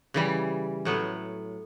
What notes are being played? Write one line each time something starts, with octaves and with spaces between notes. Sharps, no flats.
C#3 E3 G3
A2 F#3 B3